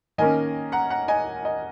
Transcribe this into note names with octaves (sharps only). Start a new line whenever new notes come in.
D#3 A#3 C#4 D#5 G#5
F#5 A#5
F#5 A#5
D#5 G#5
D#5